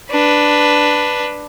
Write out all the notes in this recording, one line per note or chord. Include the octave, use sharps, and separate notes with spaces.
D4 B4